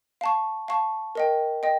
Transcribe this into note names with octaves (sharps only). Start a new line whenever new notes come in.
F5 A5 C#6
F5 A5 C#6
A#4 D#5 G5
D#5 G5